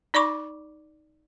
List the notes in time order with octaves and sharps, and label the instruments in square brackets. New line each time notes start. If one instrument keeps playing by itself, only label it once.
[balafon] D#4 D5 B5 C#6 D6